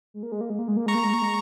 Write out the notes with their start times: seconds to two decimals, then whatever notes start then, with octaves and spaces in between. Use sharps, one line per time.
0.14 G#3
0.23 A#3
0.32 G#3
0.41 A#3
0.50 G#3
0.59 A#3
0.68 G#3
0.77 A#3
0.86 G#3 A#5 C#6
0.95 A#3
1.04 G#3
1.13 A#3
1.22 G#3